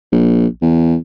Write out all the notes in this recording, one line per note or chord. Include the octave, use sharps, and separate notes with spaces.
A#1
E2